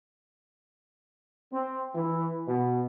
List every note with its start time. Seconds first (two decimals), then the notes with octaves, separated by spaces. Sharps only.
1.52 C4
1.95 E3
2.47 B2